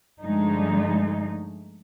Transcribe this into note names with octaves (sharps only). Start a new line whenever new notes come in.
G2 D3 F3 G#3 A3 D#4